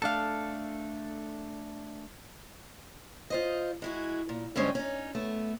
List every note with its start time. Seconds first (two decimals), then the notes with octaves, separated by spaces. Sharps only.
0.02 A3 D4 A4 F5 A5
3.30 F4 C5 D#5
3.82 G#3 E4 F#4
4.29 A#2
4.56 G2 D3 G3 G#3 C#4 C5
4.75 C#4 D#4
5.15 A3 B3